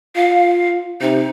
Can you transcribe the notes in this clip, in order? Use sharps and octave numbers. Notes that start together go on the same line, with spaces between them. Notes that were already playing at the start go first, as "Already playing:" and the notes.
F4 F5
C3 D#4